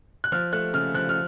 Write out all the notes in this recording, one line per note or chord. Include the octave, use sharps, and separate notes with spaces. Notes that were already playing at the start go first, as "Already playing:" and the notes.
F#6
F3 F6
A3 F#6
C#3 F6
F3 F#6
F6